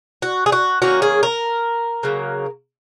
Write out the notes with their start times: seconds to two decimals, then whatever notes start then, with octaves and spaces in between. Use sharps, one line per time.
0.22 F#4
0.46 G#4
0.52 F#4
0.82 D#3 A#3 C#4 F#4
1.02 G#4
1.23 A#4
2.03 C#3 F#3 A#3